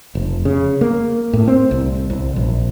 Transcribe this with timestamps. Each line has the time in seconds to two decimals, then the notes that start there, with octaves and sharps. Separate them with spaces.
0.15 F1
0.45 C#3
0.81 A#3
1.33 A2
1.47 C4
1.71 C2
2.10 C2
2.36 A#1